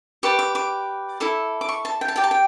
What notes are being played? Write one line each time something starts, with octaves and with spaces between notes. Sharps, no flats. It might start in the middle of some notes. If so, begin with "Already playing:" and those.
G4 B4 D5 C#6
D6
D6
E4 A4 D5
D6
C#6
A5
G5
A5
G4 D5 G5
A5
G5